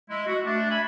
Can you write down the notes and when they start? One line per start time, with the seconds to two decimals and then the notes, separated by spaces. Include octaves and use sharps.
0.10 G#3 E4
0.27 F#4
0.46 A3 D4
0.70 E5 G#5 B5